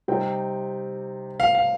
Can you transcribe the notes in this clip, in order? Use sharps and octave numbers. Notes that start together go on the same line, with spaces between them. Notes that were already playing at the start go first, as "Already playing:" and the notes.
C3 G3 C4 D#4 G5
F5
F5